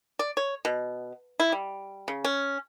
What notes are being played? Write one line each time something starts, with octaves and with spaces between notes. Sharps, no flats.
D5
C#5
B2
E4
G3
C#3
C#4